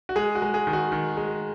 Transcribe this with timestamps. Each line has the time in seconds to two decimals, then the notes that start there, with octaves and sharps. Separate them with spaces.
0.09 F#4
0.16 G#3 G#4
0.35 F#4
0.42 G#3
0.54 G#4
0.67 D#3
0.73 F#4
0.92 D#3
1.17 G#3